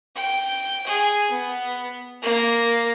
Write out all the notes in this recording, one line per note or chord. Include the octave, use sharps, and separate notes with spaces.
G5
G#4
B3
A#3